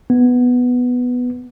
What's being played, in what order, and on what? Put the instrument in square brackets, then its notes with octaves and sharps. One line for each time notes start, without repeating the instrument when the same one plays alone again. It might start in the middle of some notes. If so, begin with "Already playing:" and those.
[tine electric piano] B3